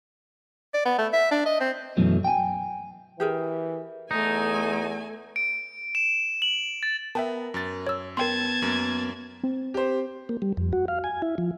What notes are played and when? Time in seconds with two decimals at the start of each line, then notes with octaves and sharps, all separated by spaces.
0.74 D5
0.86 B3
0.98 A3
1.13 E5
1.31 D4
1.46 D#5
1.60 C4
1.97 F#2 B2 E3 F#3 A3
2.24 G5 G#5
3.20 E3 G4 G#4 A#4
4.11 E2 A3 D#4 G#5
5.36 D7
5.95 E7
6.42 F#7
6.83 A6
7.15 B3 A#4 E5 G5 A5
7.54 F#2 A6
7.87 C#5 E6
8.17 B3 A#4 G5 A5 C6 G#6
8.62 F#2 A#3
9.43 C4
9.74 G4 C5
10.29 A#3
10.42 G3
10.57 F2
10.73 F#4
10.88 F5
11.04 G#5
11.22 E4
11.38 F3